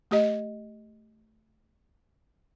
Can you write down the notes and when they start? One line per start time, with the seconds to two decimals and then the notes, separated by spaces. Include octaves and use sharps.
0.11 A3 G4 D#5